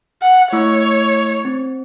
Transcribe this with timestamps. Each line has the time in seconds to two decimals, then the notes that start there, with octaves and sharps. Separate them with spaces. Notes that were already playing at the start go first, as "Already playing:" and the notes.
0.22 F#5
0.53 A3 E4 C#5 E6
1.45 C4